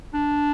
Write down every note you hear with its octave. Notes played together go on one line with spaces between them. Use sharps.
D4